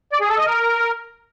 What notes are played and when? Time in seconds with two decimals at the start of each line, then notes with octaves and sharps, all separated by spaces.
0.12 D5
0.21 G#4
0.29 A4
0.38 D#5
0.46 A#4